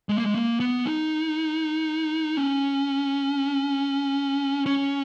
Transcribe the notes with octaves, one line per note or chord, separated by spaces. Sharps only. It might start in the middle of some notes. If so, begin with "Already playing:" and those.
G#3
A#3
G#3
A#3
B3
D#4
C#4
C#4